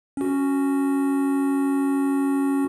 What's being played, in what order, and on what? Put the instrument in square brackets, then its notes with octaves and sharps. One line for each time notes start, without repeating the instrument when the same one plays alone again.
[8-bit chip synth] C#4 F#4